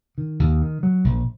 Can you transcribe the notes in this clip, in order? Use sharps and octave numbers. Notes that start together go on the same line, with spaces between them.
D#3
D#2
D#3
F#3
A#1